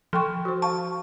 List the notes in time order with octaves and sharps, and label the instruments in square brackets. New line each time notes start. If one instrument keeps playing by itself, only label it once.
[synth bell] F3 [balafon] A4 G5 C#6
[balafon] F#4 C5
[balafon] F5 C#6 [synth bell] A5